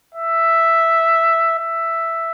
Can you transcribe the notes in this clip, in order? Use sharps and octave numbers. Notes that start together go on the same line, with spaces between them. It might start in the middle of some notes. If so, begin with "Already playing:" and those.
E5
E5